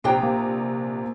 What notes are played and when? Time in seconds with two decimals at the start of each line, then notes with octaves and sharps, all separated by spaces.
0.04 A#1 C3 D4 C5 G5 A#5
0.23 A#3